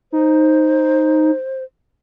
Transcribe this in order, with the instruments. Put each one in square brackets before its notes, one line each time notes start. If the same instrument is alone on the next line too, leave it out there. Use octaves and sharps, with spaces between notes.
[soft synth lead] D#4 [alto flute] C5